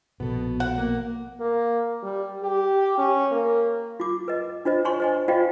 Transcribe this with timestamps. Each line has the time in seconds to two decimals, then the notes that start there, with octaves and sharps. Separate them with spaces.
0.20 A#1 B2 B3 A4
0.60 F#5
0.78 A#3
1.40 A#3
2.03 G3
2.43 G4
2.98 C#4
3.32 A#3
4.00 F4 D6
4.28 B4 D#5
4.65 D4 F4 C5 D#5
4.85 C#5 G#5 C6 C#6
5.00 C5 D#5 G#5
5.28 F4 C5 D5 D#5 F5 G5